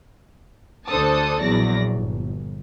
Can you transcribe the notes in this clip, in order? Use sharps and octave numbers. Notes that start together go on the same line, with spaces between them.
D2 D4 A4 C5 A5 D#6
A#1 E2 F#3 D5 A#6
G1